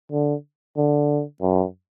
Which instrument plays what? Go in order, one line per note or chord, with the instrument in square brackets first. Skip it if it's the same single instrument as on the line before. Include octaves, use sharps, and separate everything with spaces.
[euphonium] D3
D3
F#2